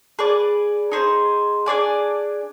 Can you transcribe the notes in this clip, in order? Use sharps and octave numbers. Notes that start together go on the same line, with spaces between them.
G#4 B4 D5
D#4 G#4 C5
D4 G#4 D5 G#5